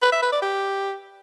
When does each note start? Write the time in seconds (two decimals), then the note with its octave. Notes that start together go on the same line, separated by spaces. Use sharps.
0.02 B4
0.12 E5
0.22 B4
0.32 D5
0.42 G4